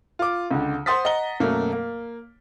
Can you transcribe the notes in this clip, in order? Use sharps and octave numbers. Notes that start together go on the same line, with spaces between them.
F4 D6
C#2 D3
C5 F#5 C6 D#6 A6 B6
D#5 F#5 A#5 G7
F#2 B2 A3 A#3
A#3